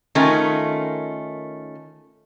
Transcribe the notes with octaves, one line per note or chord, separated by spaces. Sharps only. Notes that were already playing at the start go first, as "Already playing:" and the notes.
D#3 A3 C#4 F4 A#4 G#5